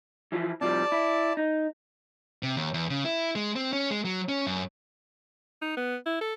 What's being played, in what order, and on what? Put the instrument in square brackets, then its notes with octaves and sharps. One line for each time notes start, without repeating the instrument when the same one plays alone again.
[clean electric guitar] E3 F3 E4
[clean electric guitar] C3 F3 G3 [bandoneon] D5 A5
[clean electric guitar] E4
D#4
[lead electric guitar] C3
D#2
E2
C#3
E4
G#3
C4
C#4
G#3
F#3
C#4
F#2
[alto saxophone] D#4
B3
E4
A4